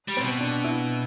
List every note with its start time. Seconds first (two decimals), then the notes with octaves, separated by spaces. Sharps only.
0.08 G3
0.17 A2 C4
0.24 B2
0.40 D4
0.64 E4